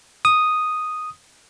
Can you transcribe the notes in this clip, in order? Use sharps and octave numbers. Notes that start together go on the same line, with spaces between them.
D#6